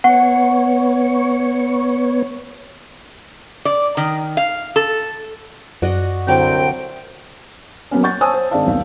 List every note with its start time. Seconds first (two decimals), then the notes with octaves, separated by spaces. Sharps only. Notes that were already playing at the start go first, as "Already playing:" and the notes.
0.04 B3 C#5 F#5
3.65 D5
3.97 D#3
4.37 F5
4.76 A4
5.82 F#2 F#4 D5 D#5
6.28 C2 D3 F#3 C4 G5 D6
7.91 F#3 A#3 B3 C#4
8.03 F#5 C#6 G6 A6
8.21 C5 C#5 G#5 A5 D#6 E6
8.34 C5
8.51 G#1 G#3 D4 D5 F5 A5
8.67 D#1 B1 D5 F5